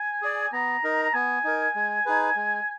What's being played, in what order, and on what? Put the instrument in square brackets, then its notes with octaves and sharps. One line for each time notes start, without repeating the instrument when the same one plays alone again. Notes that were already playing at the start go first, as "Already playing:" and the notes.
Already playing: [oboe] G#5
[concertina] G#4 D5
[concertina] B3 [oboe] A#5
[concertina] D#4 A#4
[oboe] A#5
[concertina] B3 [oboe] G#5
[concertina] D#4 A#4
G#3
D#4 G#4 B4
G#3